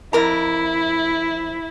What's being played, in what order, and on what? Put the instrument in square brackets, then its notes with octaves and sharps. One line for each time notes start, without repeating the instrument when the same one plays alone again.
[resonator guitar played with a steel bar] F2 A#4 A#5 [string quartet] E4